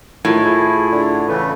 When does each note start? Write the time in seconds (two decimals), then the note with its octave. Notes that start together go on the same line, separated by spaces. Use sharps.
0.25 A2 D#3 F4 G#6
0.44 E4 G#4
0.92 D3
1.28 C#3 E3 A3 B4